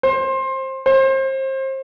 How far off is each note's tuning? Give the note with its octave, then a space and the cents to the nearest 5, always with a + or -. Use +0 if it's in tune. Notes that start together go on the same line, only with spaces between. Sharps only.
C5 +20
C5 +30